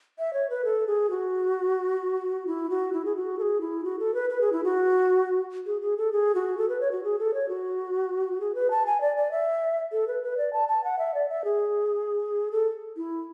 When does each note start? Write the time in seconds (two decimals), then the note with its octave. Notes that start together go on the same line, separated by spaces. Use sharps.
0.19 E5
0.33 C#5
0.50 B4
0.65 A4
0.87 G#4
1.10 F#4
2.47 E4
2.70 F#4
2.93 E4
3.05 G#4
3.16 F#4
3.39 A4
3.42 G#4
3.61 E4
3.84 F#4
3.99 A4
4.14 B4
4.30 B4
4.41 G#4
4.53 E4
4.64 F#4
5.66 G#4
5.81 G#4
5.98 A4
6.12 G#4
6.35 F#4
6.58 A4
6.69 B4
6.81 C#5
6.92 F#4
7.04 G#4
7.19 A4
7.34 C#5
7.49 F#4
8.41 G#4
8.55 B4
8.71 A5
8.86 G#5
9.01 D5
9.17 D5
9.31 E5
9.92 A4
10.08 B4
10.23 B4
10.38 D5
10.53 A5
10.69 A5
10.84 F#5
10.99 E5
11.14 D5
11.29 E5
11.44 G#4
12.52 A4
12.97 E4